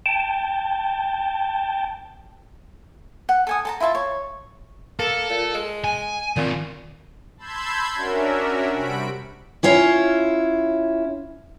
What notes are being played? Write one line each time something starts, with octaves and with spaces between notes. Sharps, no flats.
G5 A5
F#5
A4 G#5 D#6
A4 A5 A#5
E4 F4 E5 A5
C#5
A#3 A4
A#2
G#3
G#5
A#2 D#3 C4
A5 B5 C6 E6 G6 G#6
C#4 D4 F#4 A#4 E5
C3 G3 F#4 B5 B6 D7
C#4 E4 F4 C#5